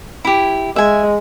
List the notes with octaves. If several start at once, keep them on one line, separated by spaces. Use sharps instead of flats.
E4 G4
G#3 E5 G#5